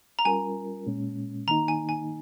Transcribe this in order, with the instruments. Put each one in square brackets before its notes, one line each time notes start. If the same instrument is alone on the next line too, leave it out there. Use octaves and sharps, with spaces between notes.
[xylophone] A#5
[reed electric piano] G3 C#4 F4 A#4 [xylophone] G#5
[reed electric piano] A#2 G#3 C#4
[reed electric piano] D#3 A#3 D#4 [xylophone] A#5
[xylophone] G#5
G#5